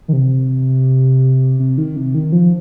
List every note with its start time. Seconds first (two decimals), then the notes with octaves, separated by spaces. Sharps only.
0.08 D#3
0.13 C3
1.60 C3
1.78 D#3
1.96 C3
2.14 D#3
2.32 F3